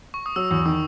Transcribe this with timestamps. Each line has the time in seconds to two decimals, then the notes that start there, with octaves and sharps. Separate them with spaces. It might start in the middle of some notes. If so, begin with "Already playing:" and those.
0.14 C#6
0.26 D#6
0.36 F#3 E6
0.51 E2
0.66 D#3 D#6